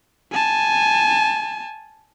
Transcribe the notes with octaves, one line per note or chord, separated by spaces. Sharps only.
G#5 A5